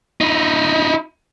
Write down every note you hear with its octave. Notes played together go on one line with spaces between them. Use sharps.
D#4 E4